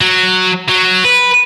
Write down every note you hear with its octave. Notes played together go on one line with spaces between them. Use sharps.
F#3
F#3
B4